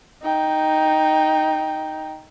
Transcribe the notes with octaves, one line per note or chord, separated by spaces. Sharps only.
D#4 G5